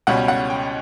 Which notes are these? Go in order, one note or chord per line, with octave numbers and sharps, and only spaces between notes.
C#2 B2 G3 C#4 F#5
F#5
G5